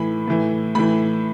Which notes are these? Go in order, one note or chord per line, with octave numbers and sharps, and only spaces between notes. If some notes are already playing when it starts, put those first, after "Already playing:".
Already playing: A2 E3 B5
A2 E3
A2 E3 B5